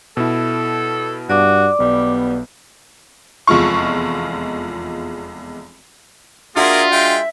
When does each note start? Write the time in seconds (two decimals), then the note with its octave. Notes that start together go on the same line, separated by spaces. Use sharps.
0.17 B2 E4 A4
1.30 G2 F#4 D5 D6
1.80 B1 G3 B3
3.47 F1 E2 G#3 F4 C#6
6.56 A#3 D4 F4 F#4 G#4 A#4 E5 C6
6.92 G#3 E5 G5